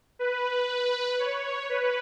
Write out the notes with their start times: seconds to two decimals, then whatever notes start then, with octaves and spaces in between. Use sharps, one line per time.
0.19 B4
1.19 C#5
1.69 B4